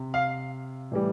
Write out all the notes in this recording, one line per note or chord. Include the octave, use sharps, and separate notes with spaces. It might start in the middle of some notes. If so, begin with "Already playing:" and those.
Already playing: C3
F5
A2 E3 G3